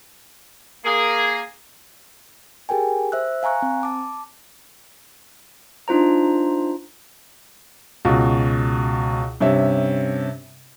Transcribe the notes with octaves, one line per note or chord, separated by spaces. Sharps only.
A#3 G#4
G4 G#4 A#4 G5 G#5
C5 E5 E6 F#6
F5 G#5 A#5 C#6 F#6
C4
A5 D6
D4 D#4 F4 C5 A#5
C#2 B2 F#4
G2 C3 C#4 E5